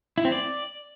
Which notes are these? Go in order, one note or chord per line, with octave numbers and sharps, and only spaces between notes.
E4
C4
D5